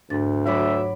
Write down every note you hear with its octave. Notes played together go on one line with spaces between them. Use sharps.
D2 G#2 D4 A6
F#3 E5 B5 D6